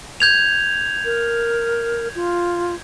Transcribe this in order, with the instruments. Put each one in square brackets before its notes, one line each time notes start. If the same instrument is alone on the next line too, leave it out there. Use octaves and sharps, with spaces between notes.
[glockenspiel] G6 G#6 F7
[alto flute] A#4
F4